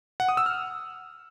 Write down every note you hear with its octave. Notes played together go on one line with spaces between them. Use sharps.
F#5
D#6
E6
F6